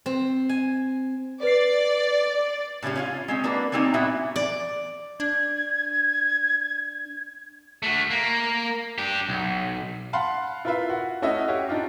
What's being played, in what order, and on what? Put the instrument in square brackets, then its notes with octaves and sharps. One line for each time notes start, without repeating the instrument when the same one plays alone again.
[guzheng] C4
G#5
[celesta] B4 C7 [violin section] D5
[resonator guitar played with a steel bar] A2 C#3 G#3 C#4 G4
C#4 E4 F4
G#3 C4 C#4
A#3 D4 F#4 B4
G3 A#3 C4 C#4 D#4
A#2 B3 E4 F#4 E5
[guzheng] D5
[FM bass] D4 [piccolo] G#6
[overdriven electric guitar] A3 F#4
A#3
D4 G4
B1
[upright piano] F5 F#5 A5 B5 C6
E4 F4 A#4 B4 E5 F5
F#4
A3 C#4 E4 F#4 D#5 E5
F#4 G4 C#5 F5
D4 D#4 F4 G4